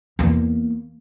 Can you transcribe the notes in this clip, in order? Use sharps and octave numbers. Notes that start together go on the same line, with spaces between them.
E2 A#3